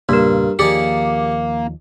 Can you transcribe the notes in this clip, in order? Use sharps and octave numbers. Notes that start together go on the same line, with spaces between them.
E2 G2 A#2 C#3 A#3 A#4
D#2 D#3 F3 A#3 G4 G#4 D5 C#7